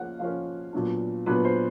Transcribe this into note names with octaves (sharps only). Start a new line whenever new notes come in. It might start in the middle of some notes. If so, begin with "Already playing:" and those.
Already playing: F3 A#3 C#4 F#5
F3 A#3 C#4 F5
A#2 F#3 B3 D4
A#2 F#3 B3 D4 B4
C5